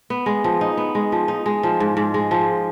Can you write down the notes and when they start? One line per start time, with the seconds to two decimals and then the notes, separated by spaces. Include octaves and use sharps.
0.10 B3
0.26 G#3
0.44 F3
0.61 D#4
0.77 B3
0.95 G#3
1.12 F3
1.28 D#4
1.46 G#3
1.63 F3
1.80 G#2
1.97 G#2
2.14 G#3
2.31 F3